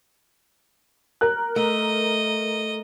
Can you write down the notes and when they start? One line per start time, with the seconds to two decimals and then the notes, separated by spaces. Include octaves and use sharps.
1.21 A#4 F#6
1.56 A3 D#5